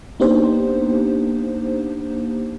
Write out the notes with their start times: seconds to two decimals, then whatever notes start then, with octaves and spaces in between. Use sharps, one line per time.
0.20 A#3 B3 D4 D#4 G4 C5